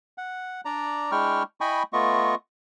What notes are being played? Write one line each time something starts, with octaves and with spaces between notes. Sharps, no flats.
F#5
D4 D5 A#5
G#3 D4 E4 G5 C#6 F6
E4 D#5 G5 G#5 B5 C#6
A3 B3 F4 D#5 C#6